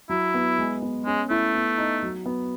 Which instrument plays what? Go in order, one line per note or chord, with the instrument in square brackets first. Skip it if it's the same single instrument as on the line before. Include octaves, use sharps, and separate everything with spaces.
[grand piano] F#3 [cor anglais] E4
[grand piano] B3
G#3
B3
[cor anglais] G#3 [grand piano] C#4
[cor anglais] A3 [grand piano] E4
[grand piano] B3
D#4
F#3
B3